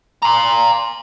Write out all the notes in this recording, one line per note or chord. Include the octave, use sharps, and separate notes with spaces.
A#5 C6